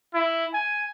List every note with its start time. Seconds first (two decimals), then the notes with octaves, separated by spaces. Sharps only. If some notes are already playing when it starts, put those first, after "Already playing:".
0.14 E4
0.54 G#5